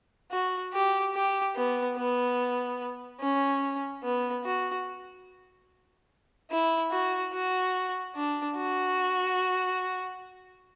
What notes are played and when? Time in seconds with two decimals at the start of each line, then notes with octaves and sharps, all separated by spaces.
0.31 F#4
0.73 G4
1.14 G4
1.55 B3
1.96 B3
3.20 C#4
4.03 B3
4.44 F#4
6.50 E4
6.91 F#4
7.33 F#4
8.15 D4
8.57 F#4